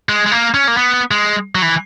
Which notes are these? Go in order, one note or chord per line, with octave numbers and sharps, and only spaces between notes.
G#3
G#3
A#3
C#4
A#3
B3
G#3
F#3
E3